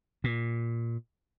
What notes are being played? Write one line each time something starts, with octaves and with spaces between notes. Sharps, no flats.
A#2